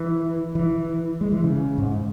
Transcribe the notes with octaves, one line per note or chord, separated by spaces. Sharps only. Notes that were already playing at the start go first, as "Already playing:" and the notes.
Already playing: E3
E3
G#3
E3
C#3
G#2